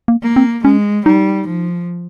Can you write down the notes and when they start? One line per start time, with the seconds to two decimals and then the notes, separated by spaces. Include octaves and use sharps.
0.08 A#3
0.22 A#3
0.36 C4
0.64 G#3 C#4
1.06 G3 D#4
1.47 F3